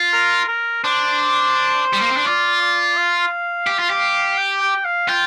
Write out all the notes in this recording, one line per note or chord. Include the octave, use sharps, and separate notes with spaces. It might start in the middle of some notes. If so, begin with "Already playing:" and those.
Already playing: F4
A#4
A#4
D4 C5
G3
A#3
C4
D4
F4 D5
D5
F5
G4
F4
G4
G5
G5
F5
F4 G5